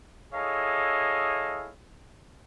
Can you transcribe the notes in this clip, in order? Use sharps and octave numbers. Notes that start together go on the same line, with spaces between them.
E4 G#4 A4 C#5 D#5 F5